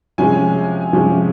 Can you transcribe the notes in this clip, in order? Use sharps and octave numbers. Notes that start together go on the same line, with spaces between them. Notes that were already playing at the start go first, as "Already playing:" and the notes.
C3 F3 G#3 C#4 G#5
C3 F3 G#3 C#4